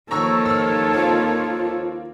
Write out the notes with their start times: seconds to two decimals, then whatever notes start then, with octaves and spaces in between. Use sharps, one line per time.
0.11 D#2 D#3 F3 A4 C#5 A#5 C#6 E6
0.46 E6 F6
0.94 A#3 C4 F4